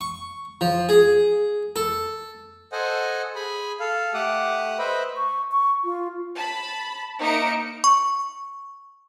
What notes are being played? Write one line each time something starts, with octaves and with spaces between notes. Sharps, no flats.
C#6
F3
G#4
A4
A4 C5 D#5 F#5 G#5
G#4 G#5 B5
A4 F5
A3 G4 F#5 D6 D#6
B4 C5 D#5 E5 B5
C#6
C#6
F4
A5 B5
A#3 D#4 E5 C#7 D7
C#6